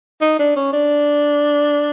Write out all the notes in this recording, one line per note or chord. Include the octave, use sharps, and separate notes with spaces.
D#4
D4
C#4
D4